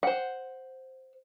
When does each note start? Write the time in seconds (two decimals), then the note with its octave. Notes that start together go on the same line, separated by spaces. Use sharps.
0.03 C5 F#5